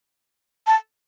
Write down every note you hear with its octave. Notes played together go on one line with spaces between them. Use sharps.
A5